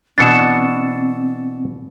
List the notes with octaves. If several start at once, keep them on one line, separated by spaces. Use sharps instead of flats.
B2 E3 C4 D4 A6 C#7 E7